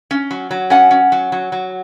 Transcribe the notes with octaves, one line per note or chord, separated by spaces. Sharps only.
C#4
F#3
F#3
C#4 F#5 G#5
C#4
F#3
F#3
F#3